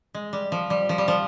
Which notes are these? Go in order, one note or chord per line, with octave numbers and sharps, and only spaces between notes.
G#3
G3
F3
G3
F3
G3
F3